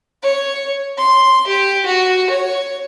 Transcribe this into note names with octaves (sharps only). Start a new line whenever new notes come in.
C#5
C6
G4
F#4
C#5